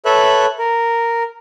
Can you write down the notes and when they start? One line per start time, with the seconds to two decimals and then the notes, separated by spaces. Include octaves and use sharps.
0.05 A4 B4 C#5 E5 F#6
0.58 A#4